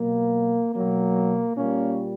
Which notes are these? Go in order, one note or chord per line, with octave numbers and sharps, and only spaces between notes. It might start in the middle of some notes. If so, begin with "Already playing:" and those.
Already playing: B2 F#3 A#3
B2 F#3 A#3
A#2 G3 A#3 C#4